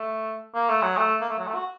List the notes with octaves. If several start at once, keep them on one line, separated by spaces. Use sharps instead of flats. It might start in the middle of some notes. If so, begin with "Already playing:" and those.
Already playing: A3
A#3
A3
F#3
A3
A#3
A3
F#3
A3
F#4